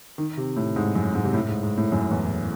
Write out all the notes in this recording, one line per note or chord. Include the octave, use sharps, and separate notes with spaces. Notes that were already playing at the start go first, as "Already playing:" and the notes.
D#3
C3
A2
G#2
F#2
G#2
C3
A2
G#2
G#2
A2
F#2
E2